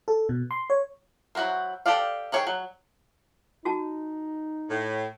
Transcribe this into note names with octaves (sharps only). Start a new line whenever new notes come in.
A4
B2
C6
C#5
F#3 E4 F#4 A#4 C5
G4 A4 C5 D5 F5
D#3 G#4 C#5 G5
F#3
D#4 F#4 A5
A2